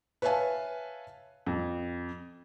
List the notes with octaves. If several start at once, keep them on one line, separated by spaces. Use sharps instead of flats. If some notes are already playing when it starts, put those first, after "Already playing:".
B4 C#5 E5 F5 G#5 A5
F2